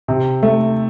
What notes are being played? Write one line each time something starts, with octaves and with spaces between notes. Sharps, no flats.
C3
A3